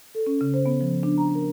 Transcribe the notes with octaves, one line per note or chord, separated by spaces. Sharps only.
A4
C#4
C#3
C5
B3
F3
D4
A#5
A#4